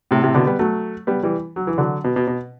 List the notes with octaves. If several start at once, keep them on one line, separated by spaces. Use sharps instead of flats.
A2 C3
A2 C3
B2 D3
G3 B3
F#3 A3
G3 B3
E3 G3
F#3
E3
D3 F#3
B2
B2
B2